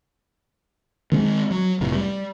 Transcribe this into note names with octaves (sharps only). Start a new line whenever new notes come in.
D#3 G#3 C4
F#3
F1 A2 C3
G3